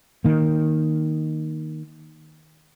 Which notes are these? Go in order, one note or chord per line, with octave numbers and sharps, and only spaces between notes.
D#3 A#3